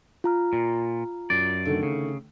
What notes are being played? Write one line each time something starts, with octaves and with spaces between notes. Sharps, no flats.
F4 A#5 F6
A#2
F#2 D5
D3 D#3 A3
C#3